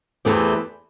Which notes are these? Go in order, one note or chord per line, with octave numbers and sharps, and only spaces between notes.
E2 E3 A3 C4 G4